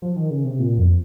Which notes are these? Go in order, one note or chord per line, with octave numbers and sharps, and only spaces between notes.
F3
D#3
C#3
C3
A#2
F2